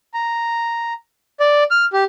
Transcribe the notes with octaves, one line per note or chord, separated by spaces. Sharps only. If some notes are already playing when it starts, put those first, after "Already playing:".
A#5
D5
F6
G4